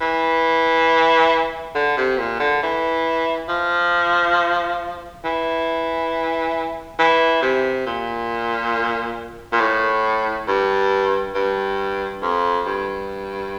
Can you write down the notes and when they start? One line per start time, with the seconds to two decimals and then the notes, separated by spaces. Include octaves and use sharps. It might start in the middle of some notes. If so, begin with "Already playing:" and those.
0.01 E3
1.75 D3
1.97 C3
2.18 A#2
2.40 D3
2.63 E3
3.49 F3
5.24 E3
6.99 E3
7.42 C3
7.86 A#2
9.52 A#2
9.60 A2
10.48 G2
11.35 G2
12.22 F2
12.66 G2